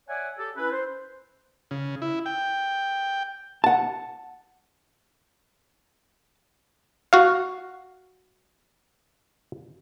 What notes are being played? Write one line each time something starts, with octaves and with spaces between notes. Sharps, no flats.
C#5 D5 E5 F#5 G#5
G4 A4
C#4 E4 B4
C5
C#3
E4
G5
F#5 A5
F#4 F5